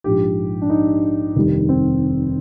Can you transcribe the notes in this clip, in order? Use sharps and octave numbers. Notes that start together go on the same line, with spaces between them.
A#1 G#2 F3 G4
D4
D#4
F1 D#2 D#3 G3
C4